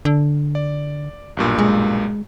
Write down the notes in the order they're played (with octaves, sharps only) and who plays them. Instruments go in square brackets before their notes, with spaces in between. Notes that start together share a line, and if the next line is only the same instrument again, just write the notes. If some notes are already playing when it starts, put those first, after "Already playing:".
[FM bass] D3
[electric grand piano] D5
B1 G2 A#2
[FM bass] G#3